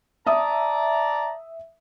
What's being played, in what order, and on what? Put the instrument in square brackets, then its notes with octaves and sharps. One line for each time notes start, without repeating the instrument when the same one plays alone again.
[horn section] D5 A5 A#5 [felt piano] E5 D#6